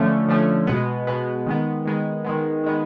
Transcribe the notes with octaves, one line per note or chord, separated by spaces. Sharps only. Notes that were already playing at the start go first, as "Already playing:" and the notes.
Already playing: D3 F3 A3 C#4
D3 F3 A3 C#4
B2 G#3 B3
B2 G#3 B3
D#3 G#3 B3
D#3 G#3 B3
D#3 G#3 B3
D#3 G#3 B3